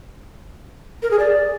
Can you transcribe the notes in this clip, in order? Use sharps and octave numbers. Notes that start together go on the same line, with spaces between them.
A#4
G#4
D5